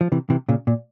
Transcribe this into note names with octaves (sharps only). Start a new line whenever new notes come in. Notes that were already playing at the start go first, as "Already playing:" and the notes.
F3
C3 E3
C3 E3
A#2 C#3
A#2